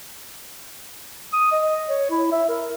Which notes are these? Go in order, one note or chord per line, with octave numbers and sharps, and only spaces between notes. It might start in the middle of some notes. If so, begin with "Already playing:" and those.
D#6
D#5
C#5
E4
E5
A#4